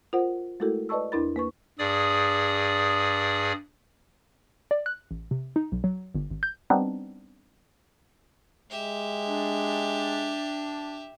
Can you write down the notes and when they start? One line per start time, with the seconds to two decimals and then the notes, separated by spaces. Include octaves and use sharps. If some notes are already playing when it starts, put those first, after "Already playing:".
0.13 F4 A#4 C5 F#5
0.60 G#3 A3 E4 F#4 A4 A#4
0.89 B4 D5 D#5 A5 C#6 E6
1.12 E2 D4 E4 A#4 B5 A6
1.36 A#3 B4 C#6
1.79 G2 G#4 D5 D#6
4.71 D5
4.86 F#6
5.11 A1
5.31 C3
5.56 D#4
5.72 B1
5.84 F#3
6.15 G1
6.31 G#1
6.43 G6
6.70 G3 B3 C4 D4 D#4
8.70 G#3 G4 E5
9.25 D4